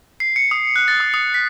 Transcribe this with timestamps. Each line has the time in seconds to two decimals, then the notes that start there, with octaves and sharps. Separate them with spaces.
0.20 C7
0.36 C#7
0.51 D#6
0.76 F#6
0.88 A6
1.00 D#6
1.14 D#6
1.34 B6